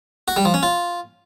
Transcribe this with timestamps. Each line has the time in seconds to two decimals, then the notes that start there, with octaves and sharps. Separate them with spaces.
0.28 F#4
0.37 G3
0.45 F3
0.54 C#4
0.63 F4